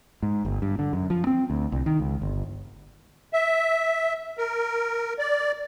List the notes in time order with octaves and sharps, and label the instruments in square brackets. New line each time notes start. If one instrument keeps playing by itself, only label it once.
[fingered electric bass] G#2
G1
G2
D3
F#2
F3
C4
D2
C2
D#3
C#2
G1
[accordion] E5
A#4
D5